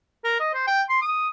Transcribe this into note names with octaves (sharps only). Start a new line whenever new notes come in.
A#4
D#5
C5
G5
C6
D#6